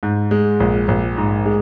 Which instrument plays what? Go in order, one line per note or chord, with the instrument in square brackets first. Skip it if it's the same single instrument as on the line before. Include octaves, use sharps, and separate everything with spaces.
[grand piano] G#2
G#3
A#1
A#1
G#2
G#3